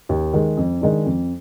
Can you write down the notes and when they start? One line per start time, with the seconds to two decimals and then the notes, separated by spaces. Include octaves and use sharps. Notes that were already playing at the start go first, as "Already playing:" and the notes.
0.09 D#2
0.33 D#3 G#3
0.57 F2
0.81 D#3 G#3 D4
1.06 F2